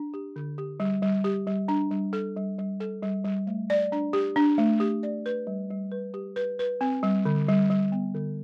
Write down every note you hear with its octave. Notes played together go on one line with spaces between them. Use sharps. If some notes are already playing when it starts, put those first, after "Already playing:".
Already playing: D4
G4
D3
G4
G3
G3
G4
G3
D4
G3
A4
G3
G3
A4
G3
G3
A3
D5
D4
G4
D4
A3
G4
D5
B4
G3
G3
B4
G4
B4
B4
C4
G3
D3
G3
G3
B3
D3